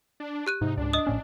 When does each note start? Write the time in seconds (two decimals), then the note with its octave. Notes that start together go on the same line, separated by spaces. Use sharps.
0.20 D4
0.46 G4 F#6 D#7
0.61 G#2 C3 D#4
0.77 C#2 G#2 D4
0.93 D#5 D#6
1.07 A#1 A2 C#4